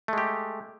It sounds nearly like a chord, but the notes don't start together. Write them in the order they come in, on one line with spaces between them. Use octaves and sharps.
A3 G#3 G4